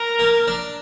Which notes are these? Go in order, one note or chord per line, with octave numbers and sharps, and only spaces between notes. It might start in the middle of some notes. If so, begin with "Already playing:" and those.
Already playing: A#4
A#3
D4